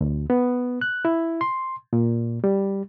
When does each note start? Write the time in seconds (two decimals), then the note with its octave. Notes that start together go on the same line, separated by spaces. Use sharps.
0.01 D2
0.30 B3
0.81 F#6
1.05 E4
1.41 C6
1.93 A#2
2.44 G3